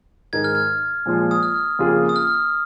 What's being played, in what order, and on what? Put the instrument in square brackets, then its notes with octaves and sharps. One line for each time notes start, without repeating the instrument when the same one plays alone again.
[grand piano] G#2 D#3 G#3 D#4 A#4 [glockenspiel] G#6
[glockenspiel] F6
G#6
[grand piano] A#2 F3 G#3 F4
[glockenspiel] D#6
F6
[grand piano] F2 C#3 A#3 F4 G#4
[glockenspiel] D#6
F6